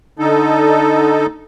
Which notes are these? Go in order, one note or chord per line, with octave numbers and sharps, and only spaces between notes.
D3 D#4 A4